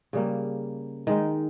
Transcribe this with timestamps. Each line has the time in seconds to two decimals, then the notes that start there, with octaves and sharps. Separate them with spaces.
0.13 C#3 G3 A#3
1.07 D#3 G#3 D#4